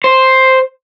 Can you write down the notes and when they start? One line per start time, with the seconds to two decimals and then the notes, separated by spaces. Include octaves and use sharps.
0.04 C5